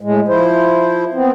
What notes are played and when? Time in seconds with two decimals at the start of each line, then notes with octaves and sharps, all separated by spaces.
0.01 A2 G#3
0.28 F3 E4 C5
1.14 B3 C4